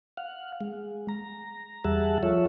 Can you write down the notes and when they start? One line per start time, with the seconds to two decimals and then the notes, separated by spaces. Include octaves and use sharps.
0.17 F5 F#5
0.61 G#3
1.09 A#5
1.84 E2 G3 G#4 E5 F#5 A5
2.23 F3 F4 A4 C#5 E5